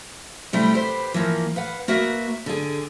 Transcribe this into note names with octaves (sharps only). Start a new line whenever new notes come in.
C3 G3 A3 E4 G4
G4 B4 C5
E3 F3 A#3
B4 F5 F#5
A#3 F#4 B4 E5
D3 G#4